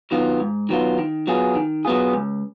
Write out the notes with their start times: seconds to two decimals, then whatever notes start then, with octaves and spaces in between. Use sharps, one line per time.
0.11 D#3 F#3 B3 F4
0.40 G#2
0.69 D#3 F#3 B3 F4
0.99 D#3
1.27 F#3 B3 F4 G#4
1.55 D#3
1.85 F#3 B3 F4 G#4
2.13 C#2